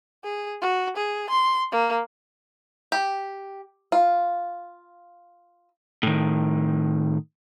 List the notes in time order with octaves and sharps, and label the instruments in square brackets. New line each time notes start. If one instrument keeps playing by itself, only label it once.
[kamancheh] G#4
F#4
G#4
C6
A#3
[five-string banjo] G4
F4
[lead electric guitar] A2 D#3